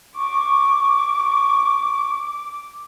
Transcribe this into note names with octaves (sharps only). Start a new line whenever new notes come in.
C#6 D6